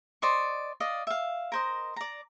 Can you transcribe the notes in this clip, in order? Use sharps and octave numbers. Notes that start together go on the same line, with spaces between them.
C5 D5 D#5 C#6
D5 D#5 F5
E5 F5
A#4 C5 D#5
D5 A#5